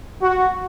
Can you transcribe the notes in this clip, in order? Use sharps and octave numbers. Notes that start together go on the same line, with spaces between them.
F#4